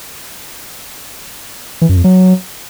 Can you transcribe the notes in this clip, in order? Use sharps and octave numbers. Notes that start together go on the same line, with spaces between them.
E3
F#2
F2
F#3